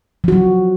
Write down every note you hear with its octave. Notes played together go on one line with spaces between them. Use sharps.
F3 F#3 F#4